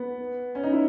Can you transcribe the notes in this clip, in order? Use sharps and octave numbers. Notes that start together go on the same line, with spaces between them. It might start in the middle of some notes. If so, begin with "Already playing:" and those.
Already playing: B3
C#4
D#4
E4